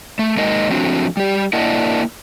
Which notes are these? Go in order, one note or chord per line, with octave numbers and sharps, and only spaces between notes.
A3
G#3 A#3 D#4 A#4 D#5
F3 A3 C4 D4 F#4
G3 G4
A#3 D4 E4 A#4 D#5 F#5